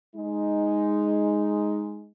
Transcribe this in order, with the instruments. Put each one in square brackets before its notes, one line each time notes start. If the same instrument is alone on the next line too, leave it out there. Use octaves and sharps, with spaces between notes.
[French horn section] G#3 D#4